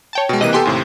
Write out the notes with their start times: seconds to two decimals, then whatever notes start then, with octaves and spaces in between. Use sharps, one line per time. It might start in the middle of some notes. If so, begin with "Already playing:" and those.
0.13 C#5 G5 A5
0.29 B2 G#3
0.41 C3 E3 A#3 D#5 F#6 D#7
0.53 B3 G4 A4 G5 G#5 C6
0.65 D#2 A2 C3